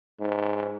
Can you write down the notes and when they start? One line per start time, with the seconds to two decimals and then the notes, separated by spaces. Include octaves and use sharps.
0.20 G#2